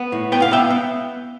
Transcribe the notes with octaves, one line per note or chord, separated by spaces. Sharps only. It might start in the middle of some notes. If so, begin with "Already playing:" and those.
Already playing: B3
A2
B3 G5
F5
B3 E5 G5
B3